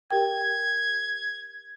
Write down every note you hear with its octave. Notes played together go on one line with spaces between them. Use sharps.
G4 A#4 G5 G#6